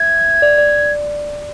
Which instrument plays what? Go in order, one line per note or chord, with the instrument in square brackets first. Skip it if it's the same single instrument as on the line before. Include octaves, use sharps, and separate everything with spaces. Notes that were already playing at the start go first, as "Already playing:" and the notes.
Already playing: [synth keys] E5 [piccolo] G#6
[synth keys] D5
D5